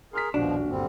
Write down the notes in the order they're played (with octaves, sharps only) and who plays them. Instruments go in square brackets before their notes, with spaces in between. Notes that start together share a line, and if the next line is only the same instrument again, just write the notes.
[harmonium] G#4 A#4 [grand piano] C6 F6 B6
[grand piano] D#1 F#4 [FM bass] A#1 [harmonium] B2 F3 [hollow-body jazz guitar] D4
[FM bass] G1 [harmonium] D3 G3 C4